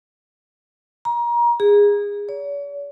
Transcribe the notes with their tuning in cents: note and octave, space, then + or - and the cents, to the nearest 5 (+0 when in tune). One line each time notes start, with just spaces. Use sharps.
A#5 +30
G#4 -20
C#5 +45